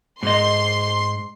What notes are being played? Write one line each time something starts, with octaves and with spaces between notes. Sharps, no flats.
G#2 D#5 C6